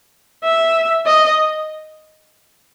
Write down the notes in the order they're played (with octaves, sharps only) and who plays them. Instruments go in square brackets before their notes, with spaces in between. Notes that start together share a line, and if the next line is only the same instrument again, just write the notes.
[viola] E5
D#5